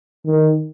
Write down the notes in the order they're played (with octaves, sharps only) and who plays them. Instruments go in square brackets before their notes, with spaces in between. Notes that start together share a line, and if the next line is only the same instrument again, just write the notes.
[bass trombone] D#3